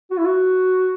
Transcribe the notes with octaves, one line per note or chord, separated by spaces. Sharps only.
F#4
E4
F#4